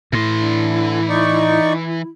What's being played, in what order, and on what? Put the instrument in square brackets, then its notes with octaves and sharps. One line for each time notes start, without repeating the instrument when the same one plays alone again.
[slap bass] A2 [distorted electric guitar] E3 C6 [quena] E4
[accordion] D3
D#4 D5 C#6